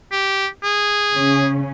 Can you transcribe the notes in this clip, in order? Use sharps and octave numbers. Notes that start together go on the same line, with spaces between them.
G4
G#4
C#3 C#4